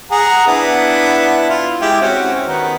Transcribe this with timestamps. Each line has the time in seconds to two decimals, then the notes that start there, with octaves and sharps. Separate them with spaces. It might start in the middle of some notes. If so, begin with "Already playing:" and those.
0.11 G#4 F#5 A#5
0.47 B3 D4 E4
1.49 F4
1.81 G#3 E4 G4
2.01 C4 C#4 F#4
2.46 D#3 B3 D#4